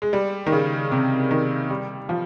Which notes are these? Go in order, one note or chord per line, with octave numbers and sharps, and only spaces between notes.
G#3
G3
D#3
C#3
C3
D#3
G3
F3